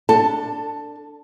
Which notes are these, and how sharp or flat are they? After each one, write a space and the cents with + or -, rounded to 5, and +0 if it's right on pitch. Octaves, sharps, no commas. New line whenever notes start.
D4 +0 A4 +20 A5 +0